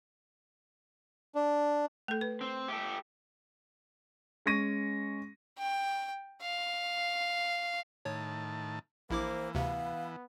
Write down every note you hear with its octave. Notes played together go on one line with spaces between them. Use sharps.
D4
A3 A4
B4
C4
G4 A4
G#3 C#4 C#6 A#6 D#7
G5
F5
A2 D#3 C#5 A5
A#1 E3 A#3 E4 C5 D6
D2 C3 B3 F5